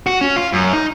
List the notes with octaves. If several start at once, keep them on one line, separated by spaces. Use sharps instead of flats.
F#4
C#4
F4
F#2
D#4